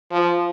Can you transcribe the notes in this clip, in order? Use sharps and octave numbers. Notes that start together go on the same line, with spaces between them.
F3